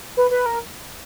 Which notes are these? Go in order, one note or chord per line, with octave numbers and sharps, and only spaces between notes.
B4
B4
A#4